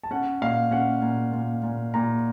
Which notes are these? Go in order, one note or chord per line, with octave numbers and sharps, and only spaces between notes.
A5
C#4 F#5
A#2 F5
C#4 F#5
A#2
A#2
A#2
A#2 A#5